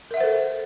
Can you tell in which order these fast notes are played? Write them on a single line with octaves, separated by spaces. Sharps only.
A#4 E5 F#5 C5 A4